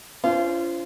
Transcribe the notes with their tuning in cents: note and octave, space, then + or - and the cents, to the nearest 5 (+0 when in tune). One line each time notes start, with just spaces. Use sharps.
C#4 +40 F4 -30 C5 +0